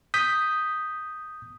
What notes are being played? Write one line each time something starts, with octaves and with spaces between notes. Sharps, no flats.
D#6 G6 B6